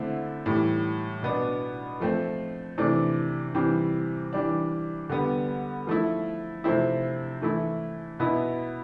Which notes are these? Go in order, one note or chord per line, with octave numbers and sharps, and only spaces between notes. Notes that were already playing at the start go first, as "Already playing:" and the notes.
Already playing: D3 A3 C4 E4
A2 E3 G3
B2 B3 D4
F3 A3 C4
C3 E3 A3 D4
C3 E3 G3 C4
E3 G3 D4
D3 G3 B3
F3 A3 E4
C3 F3 A3 C4 E4
E3 A3 E4
B2 B3 E4